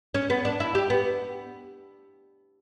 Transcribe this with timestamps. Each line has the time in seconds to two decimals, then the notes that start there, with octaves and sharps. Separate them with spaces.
0.14 C#4
0.30 B3
0.45 D4
0.60 E4
0.75 G4
0.90 B3